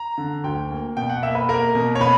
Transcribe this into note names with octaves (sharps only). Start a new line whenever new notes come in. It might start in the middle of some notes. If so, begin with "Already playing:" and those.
Already playing: A#5
D3
D2 G5
A#3
B2 G5
F#5
A#3 E5
B4
A#3 A#4
B2
C#5
B2 B4